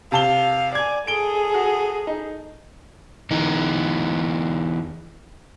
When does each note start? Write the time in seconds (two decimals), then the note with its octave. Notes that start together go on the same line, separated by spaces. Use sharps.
0.12 C3 F5 A5 G7
0.75 D5 G#5 G#6
1.07 G#4 A4 D7 G7
1.54 F#4
2.07 D#4
3.31 E2 E3 D#4